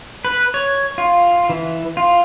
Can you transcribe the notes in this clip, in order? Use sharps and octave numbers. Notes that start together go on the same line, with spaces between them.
B4
C#5
F4
E3
F4